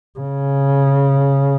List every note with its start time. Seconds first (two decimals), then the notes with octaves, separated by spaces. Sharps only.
0.20 C#3